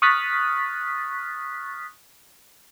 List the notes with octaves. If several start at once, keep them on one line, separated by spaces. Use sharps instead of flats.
C#6 D#6 F6 F#6 A6 B6